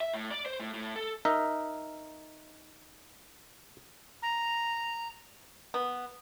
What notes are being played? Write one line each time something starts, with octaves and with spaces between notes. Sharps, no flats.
E5
A2
D5
C5
A2
A2
A4
D#4 A#4 D#5 E5
A#5
B3